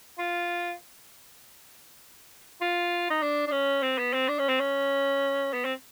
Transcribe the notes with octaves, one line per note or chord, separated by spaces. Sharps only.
F4
F4
D#4
D4
D4
C#4
C4
B3
C4
D4
C#4
C4
C#4
B3
C4